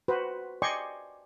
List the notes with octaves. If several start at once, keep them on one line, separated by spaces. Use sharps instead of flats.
F#4 B4 C5
D5 D#5 G5 G#5 C6 C#6